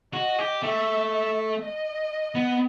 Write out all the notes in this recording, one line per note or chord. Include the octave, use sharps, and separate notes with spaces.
F#4 D#5
G4
A3 E5
E5
D#5
B3